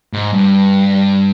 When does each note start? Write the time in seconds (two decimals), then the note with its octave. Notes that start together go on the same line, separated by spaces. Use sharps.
0.13 G#2
0.33 G2